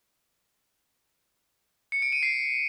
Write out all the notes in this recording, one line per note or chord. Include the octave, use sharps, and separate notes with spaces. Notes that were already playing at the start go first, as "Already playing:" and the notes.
C#7
D7
D#7
C7